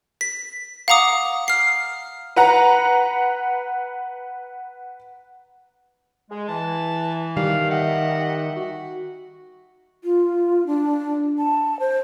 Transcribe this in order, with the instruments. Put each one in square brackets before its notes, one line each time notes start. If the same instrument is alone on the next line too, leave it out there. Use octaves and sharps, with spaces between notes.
[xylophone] B6
F5 F#5 A#5 D6 D#6
F6 C7
[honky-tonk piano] B4 F#5 A#5
[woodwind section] G#3
[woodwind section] E3 [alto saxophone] A5
[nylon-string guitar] D#3 G3 [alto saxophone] F5
[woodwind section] G4 D#5 E5 [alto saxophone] F#5
[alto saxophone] F#4
[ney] F4
D4
A5
C5